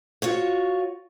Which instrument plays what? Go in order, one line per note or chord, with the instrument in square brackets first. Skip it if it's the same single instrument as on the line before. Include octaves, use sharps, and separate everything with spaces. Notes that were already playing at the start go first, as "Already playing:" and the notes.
[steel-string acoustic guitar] F4 F#4 C#5